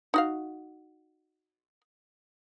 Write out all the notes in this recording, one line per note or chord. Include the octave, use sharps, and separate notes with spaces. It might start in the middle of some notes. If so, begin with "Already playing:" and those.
D#4 F#4 F5